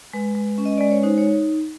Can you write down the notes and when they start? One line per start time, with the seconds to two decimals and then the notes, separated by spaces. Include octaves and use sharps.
0.13 G#3 B4
0.35 G#3
0.58 C#4
0.65 D#5
0.78 G#3 D5
0.91 C#5
1.03 D#4 C5
1.18 C#5